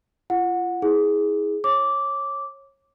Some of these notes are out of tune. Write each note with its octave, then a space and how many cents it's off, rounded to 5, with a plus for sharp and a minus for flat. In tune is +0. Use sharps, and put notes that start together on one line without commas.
F4 -30 F#5 -20
E4 -35 G#4 +0
C#5 -20 D6 -10